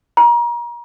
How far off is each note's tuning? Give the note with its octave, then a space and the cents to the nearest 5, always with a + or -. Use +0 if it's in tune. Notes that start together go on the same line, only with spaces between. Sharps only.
A#5 +30